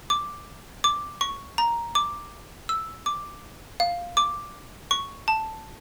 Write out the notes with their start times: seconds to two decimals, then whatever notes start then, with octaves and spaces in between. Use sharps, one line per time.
0.10 D6
0.84 D6
1.21 C#6
1.58 A#5
1.95 D6
2.69 E6
3.06 D6
3.80 F5
4.17 D6
4.91 C#6
5.28 A5